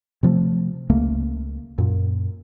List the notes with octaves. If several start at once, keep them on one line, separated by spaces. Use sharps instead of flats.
C3 F3 G3 A3
C#2 C#3 A3 A#3
F#2 A#2